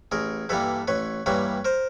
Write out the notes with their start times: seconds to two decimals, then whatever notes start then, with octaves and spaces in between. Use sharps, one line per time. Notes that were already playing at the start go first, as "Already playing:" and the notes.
0.12 A1 G#4 A#4
0.49 G2 E3 G3 A#3 A4 B4
0.88 A1 B4 C#5
1.26 G2 E3 G3 A#3 B4 C#5
1.65 A#4 C5